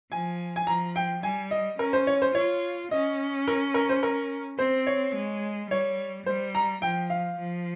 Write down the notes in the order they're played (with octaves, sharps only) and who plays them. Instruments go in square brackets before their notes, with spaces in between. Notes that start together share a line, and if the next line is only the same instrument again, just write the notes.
[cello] F3 [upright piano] G#5
[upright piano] G#5
[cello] F3 [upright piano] A#5
[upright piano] G5
[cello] G3 [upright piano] G#5
[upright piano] D#5
[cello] C#4 [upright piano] A#4
[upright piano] C5
C#5
C5
[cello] F4 [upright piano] C#5
[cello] C#4 [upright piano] D#5
[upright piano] A#4
A#4
C5
A#4
[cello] C4 [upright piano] C5
[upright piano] C#5
[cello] G#3
[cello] G3 [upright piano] C#5
[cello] G3 [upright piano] C5
[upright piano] A#5
[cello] F3 [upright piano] G5
[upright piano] F5
[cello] F3